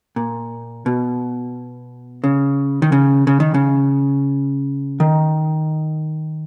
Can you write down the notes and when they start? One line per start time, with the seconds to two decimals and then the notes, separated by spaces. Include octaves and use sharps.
0.16 A#2
0.86 B2
2.24 C#3
2.82 D#3
2.92 C#3
3.27 C#3
3.40 D#3
3.54 C#3
5.00 D#3